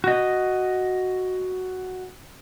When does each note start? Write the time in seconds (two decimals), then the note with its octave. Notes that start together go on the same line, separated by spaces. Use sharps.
0.04 F#4 D#5